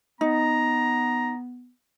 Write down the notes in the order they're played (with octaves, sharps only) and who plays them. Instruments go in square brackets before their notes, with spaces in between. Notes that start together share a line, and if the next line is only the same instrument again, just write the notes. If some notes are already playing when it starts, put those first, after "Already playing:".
[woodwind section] B3 [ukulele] D#4 [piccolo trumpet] A#5